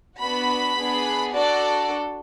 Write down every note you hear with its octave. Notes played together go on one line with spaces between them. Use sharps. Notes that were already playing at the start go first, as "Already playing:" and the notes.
B3 D4 F#4 B5
B3 D4 G#4
D4 F#4 A4 D5